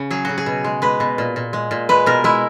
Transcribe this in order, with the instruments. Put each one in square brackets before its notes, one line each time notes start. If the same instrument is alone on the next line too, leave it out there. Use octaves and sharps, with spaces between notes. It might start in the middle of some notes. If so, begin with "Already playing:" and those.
Already playing: [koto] C#3
F#3 G#4
C#3 F#4
G#4
B2
G#3
G#3 B4
B2
A#2
A#2
G#3
A#2
G#3 B4
B2 A#4
G#3 E4